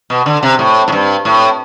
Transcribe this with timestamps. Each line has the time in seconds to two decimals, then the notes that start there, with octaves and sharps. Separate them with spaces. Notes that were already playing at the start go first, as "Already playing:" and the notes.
0.10 B2
0.26 D3
0.43 C3
0.59 A2
0.88 A2
0.92 G2
1.25 A2